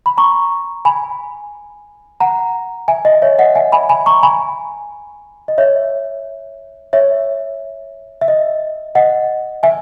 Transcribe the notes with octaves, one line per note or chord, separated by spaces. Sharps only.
B5
A#5 C#6
G#5 B5
F#5 A#5
E5 G#5
D#5
C#5 E5
D#5 F#5
E5 G#5
G#5 B5
G#5 B5
A#5 C#6
G#5 B5
D#5
C#5 E5
C#5 E5
E5
D#5
D#5 F#5
E5 G#5